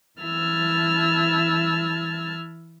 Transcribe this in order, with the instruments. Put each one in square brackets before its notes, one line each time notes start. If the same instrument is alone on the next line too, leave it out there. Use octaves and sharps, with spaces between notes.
[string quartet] E3 E4 A5 E6 F6 G#6